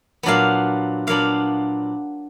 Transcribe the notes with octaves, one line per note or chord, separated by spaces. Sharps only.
A#2 F#3 B3 D4 F5
A#2 F#3 B3 D4 F5